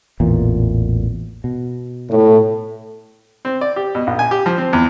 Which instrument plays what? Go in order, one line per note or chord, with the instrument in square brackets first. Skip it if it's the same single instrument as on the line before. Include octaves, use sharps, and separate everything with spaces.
[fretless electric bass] A1 E2 A#2
B2
[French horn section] A2
[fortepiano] C4
D5
G4
B2
A#1
G#5
G4
F3
C4
E2